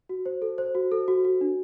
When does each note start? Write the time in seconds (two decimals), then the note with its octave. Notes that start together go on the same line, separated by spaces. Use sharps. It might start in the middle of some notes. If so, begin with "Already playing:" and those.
0.09 F#4
0.26 C5
0.42 A4
0.58 C5
0.75 F#4
0.92 A4
1.08 F#4
1.25 F#4
1.41 D4